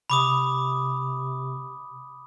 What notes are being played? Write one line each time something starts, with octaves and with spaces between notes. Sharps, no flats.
C3 B5 D6 D#6